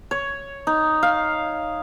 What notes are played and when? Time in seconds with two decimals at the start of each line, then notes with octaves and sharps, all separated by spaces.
0.11 C#5
0.67 D#4
1.03 F5